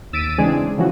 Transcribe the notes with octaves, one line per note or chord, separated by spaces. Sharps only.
D#2 E6 A6 B6 D7 D#7
C#3 E3 G#3 C4 D4 G#4
C#3 E3 F3 F#4